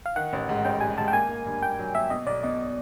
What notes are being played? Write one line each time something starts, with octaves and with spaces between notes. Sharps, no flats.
F5
D#3 F#5
A1
G#2
A1 G5
G3 G#5
G#2 A5
G5
A#3 G#5
A#3
G2
A#3 G5
F#3
A#3 E5
B2 D#5
B1 D5
B2 D#5